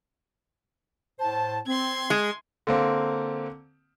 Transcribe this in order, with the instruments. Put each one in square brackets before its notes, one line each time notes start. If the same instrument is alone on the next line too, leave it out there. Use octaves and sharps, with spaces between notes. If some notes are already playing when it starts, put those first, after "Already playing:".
[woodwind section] A2 C5 A5
[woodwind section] C4 [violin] C6 G#6
[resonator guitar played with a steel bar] G#3
[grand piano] D3 A#3 C4